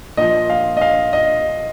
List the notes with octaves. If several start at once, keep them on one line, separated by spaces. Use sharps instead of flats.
A#2 F3 D#5
F5
D#5
F5
D#5